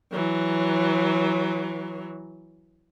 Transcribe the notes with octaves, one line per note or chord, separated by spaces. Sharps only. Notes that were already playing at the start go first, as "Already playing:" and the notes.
E3 F#3